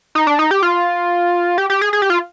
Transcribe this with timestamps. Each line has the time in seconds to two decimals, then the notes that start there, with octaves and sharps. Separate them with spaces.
0.15 D#4
0.27 D4
0.39 D#4
0.51 G4
0.62 F4
1.58 G4
1.70 G4
1.81 G#4
1.93 G#4
2.02 G4
2.10 F4